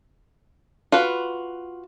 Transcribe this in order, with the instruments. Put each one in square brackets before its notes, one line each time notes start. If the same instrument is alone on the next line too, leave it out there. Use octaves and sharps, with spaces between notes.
[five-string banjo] F4 F#4 B4